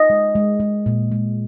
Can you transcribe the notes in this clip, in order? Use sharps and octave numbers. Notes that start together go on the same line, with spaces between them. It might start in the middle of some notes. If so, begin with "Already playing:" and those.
Already playing: D#5
G#3
G#3
G#3
A#2
G#3